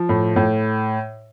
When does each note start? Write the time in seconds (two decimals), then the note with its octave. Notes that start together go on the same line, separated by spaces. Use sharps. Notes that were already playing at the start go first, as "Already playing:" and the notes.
Already playing: F3
0.09 A2
0.36 A2